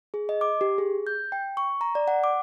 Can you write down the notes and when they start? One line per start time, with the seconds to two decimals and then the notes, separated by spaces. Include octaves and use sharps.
0.14 G#4
0.29 D#5
0.41 D6
0.61 G4
0.78 G#4
1.07 G6
1.32 G5
1.57 C#6
1.81 A#5
1.95 D5
2.08 F#5
2.24 D6